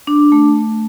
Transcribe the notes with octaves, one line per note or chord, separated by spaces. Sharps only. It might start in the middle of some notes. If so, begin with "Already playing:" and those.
D4
A3
A3